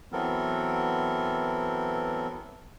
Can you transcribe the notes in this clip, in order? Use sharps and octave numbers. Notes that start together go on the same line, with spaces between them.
E3 F#3 B3 C4 A4 A#4